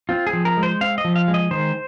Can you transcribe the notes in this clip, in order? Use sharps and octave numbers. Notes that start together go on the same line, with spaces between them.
C4 F4
G#4
F3
A#4
G#3
C5
C4 F5
D#5
F3
F5
G#3
D#5
D#3 C5